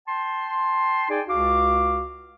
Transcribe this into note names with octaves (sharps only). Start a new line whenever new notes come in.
G5 A5 C6
D#4 G#4 D5 G5 G#5
C#2 F#4 F5 D6